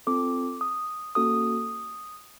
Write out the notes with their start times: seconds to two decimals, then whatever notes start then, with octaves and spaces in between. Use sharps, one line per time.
0.07 C4 F4 A4 D6
0.61 D#6
1.15 A#3 C#4 F#4 A4 D#6